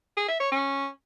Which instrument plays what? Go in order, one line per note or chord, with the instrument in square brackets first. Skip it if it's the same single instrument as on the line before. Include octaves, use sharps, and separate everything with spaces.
[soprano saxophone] G#4
E5
C#5
C#4